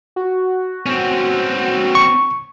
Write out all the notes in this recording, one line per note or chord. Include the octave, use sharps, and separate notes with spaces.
F#4
C4 C#4
C#6